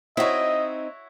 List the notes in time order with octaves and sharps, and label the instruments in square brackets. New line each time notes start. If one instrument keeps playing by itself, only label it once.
[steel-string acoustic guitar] C4 D#4 [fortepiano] E4 F#4 C#5 [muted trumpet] D#5